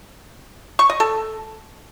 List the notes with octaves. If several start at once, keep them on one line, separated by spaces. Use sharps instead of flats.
C#6
D#5
A4